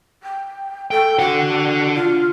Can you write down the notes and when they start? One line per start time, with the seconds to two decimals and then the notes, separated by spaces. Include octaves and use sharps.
0.23 G5
0.91 A4 G5
1.19 D3 F#4 F#5
1.95 F4